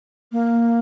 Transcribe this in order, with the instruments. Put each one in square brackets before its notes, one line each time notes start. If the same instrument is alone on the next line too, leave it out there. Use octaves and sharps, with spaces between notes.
[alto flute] A#3